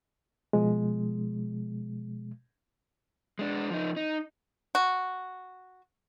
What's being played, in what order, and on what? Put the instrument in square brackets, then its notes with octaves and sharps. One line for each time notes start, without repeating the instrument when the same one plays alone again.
[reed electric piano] B2 F3 G#3
[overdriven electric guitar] G#3 D4
F3 D#4
D#4
[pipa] F#4